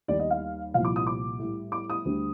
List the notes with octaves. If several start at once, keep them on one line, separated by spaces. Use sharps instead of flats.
D#2 D#3 G3 D5
D#5
F5
C2 A#2 F3 F5
D6
D#6
D6
A2 G3
D6
D#6
D2 D3 G3